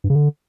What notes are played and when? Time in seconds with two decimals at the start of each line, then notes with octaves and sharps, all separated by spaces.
0.04 G2
0.10 C#3
0.16 D3